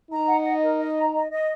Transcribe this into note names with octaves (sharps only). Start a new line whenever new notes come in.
D#4 A#5
F#5
D#5
A#4
D#5
A#5
D#5
D#5